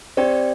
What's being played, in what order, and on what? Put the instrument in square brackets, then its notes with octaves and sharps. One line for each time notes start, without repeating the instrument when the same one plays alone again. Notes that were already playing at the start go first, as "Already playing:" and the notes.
[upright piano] C4 [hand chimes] G4 D5 G5